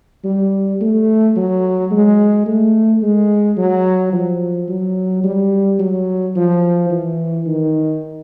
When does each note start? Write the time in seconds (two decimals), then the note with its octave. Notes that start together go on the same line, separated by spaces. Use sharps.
0.24 G3
0.81 A3
1.36 F#3
1.91 G#3
2.46 A3
3.03 G#3
3.58 F#3
4.13 F3
4.69 F#3
5.24 G3
5.80 F#3
6.36 F3
6.90 E3
7.47 D#3